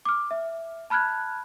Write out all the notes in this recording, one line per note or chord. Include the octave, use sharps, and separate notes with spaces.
D6 F6
E5
A5 B5 F6 F#6 G#6